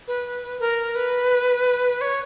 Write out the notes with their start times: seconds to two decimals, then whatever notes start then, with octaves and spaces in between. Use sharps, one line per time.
0.07 B4
0.60 A#4
0.95 B4
2.01 C#5